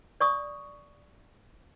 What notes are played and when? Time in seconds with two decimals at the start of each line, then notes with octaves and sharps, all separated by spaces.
0.21 D5 C#6 D#6